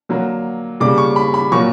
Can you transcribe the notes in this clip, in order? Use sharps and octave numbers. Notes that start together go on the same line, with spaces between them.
D3 F#3 A#3
C#3 G3 A#3 D6
C#6
B5
B5
A#2 F#3 A#3 C#6